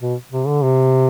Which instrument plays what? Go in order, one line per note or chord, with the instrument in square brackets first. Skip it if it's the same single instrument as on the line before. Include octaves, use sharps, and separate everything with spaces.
[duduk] B2
C3
D3
C3